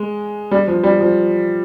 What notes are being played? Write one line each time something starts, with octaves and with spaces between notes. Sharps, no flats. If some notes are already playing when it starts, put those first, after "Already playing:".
Already playing: G#3
G3
F3
G3
F3